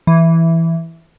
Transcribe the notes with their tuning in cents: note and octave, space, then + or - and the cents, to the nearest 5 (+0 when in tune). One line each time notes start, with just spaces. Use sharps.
E3 +0